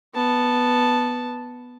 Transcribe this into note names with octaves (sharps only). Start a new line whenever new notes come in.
B3 A5